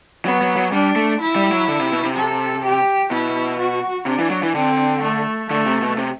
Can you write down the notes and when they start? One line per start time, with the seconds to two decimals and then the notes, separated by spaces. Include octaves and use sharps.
0.24 F#3 B3
0.41 F#3
0.56 F#3
0.72 G3 D4
0.96 A3
1.21 E4
1.36 G3
1.52 F#3
1.68 D3
1.80 C3
1.92 B2
2.04 C3
2.16 A4
2.64 G4
3.11 B2 E4
3.59 F#4
4.06 C3 D4
4.19 E3
4.30 F#3
4.43 E3
4.54 D3 C4
5.02 A3
5.50 D3 A3
5.66 C3
5.82 B2
5.98 C3